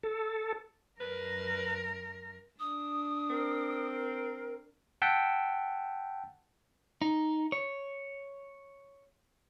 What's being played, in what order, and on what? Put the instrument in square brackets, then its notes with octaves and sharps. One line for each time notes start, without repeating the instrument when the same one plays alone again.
[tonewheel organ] A4
[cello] F#2 A#4 [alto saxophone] B4
[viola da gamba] D4 [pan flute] D#6
[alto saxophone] C4 [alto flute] A#4
[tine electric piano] F#5 G5 A5 E6 G6 B6
[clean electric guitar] D#4
C#5